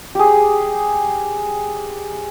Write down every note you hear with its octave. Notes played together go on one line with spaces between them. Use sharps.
G4 G#4